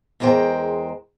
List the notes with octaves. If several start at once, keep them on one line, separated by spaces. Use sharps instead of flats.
E2 G#3 A#4 C5 G5